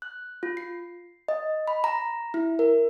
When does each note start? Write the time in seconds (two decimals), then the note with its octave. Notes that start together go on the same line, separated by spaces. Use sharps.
0.02 F#6
0.43 F4
0.57 C7
1.28 D#5
1.68 B5
1.84 A#5
2.34 E4
2.59 A#4